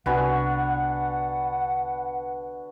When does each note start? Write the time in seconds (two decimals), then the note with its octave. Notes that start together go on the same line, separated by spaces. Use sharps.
0.06 C2 D3 B3 F#4 B4 F#5 G#5